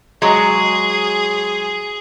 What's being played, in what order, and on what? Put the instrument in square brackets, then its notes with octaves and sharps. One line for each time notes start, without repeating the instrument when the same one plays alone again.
[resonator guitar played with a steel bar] F#3 G#3 [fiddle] G#4